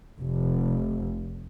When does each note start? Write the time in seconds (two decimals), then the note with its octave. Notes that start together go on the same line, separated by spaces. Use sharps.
0.19 F1